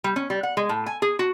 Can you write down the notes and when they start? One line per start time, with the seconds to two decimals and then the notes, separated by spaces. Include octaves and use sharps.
0.04 G3
0.16 C#4
0.30 G3
0.43 F#5
0.57 G#3
0.69 A2
0.86 G#5
1.02 G#4
1.19 F#4